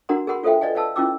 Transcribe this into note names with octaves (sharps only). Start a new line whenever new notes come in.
D4 F#4 A#4 F#5 A#5 C6
G#4 A#4 F#5 B5 C6
F4 A4 C5 E5 F5 G5
B4 D5 D#5 F5 G#5
B4 D5 F5 A5 E6
C#4 E4 F4 G5 D6 E6